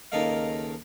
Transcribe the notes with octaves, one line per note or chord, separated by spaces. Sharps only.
C#2 D#3 A3 A#3 D#5 F5